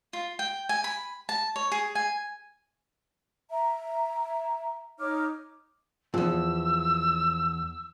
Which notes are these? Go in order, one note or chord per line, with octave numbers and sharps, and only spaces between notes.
F4
G5
G#5
B5
A5
C#5
G#4
G#5
E5 A#5
D#4 C#5 D6 F6
E2 G2 F3 E6